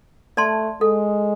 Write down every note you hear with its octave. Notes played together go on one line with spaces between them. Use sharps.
A3 D5 A5 C6
G#3 A4